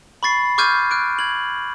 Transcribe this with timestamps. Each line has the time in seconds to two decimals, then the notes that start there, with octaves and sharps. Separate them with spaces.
0.23 B5 C#6 A6 C7
0.58 C#6 D6 F6 G6 G#6 D#7
0.91 F6 F#6 D7
1.19 G#6 F#7